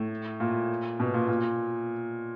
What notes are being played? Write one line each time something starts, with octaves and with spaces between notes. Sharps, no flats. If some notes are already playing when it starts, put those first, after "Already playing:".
Already playing: A2
A#2
B2
A#2
A#2